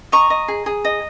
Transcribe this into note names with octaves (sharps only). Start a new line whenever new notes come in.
D#5 A#5 C#6
D#5
G#4
G#4
D#5